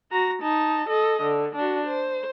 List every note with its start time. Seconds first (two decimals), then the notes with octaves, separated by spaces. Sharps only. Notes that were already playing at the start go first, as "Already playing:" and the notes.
0.11 F#4 A#5
0.42 D#4 A5
0.89 A4 D#5
1.22 D3
1.56 D4 F#4
1.87 C5